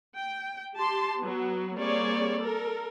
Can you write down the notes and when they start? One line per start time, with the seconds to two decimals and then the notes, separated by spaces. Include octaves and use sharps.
0.18 G5
0.75 G4 A5 C6
1.21 F#3 B3
1.77 G3 A#3 C4 G#4 C#5 D5
2.38 A4 A#4